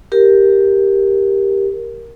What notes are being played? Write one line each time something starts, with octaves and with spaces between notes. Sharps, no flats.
G4 A#4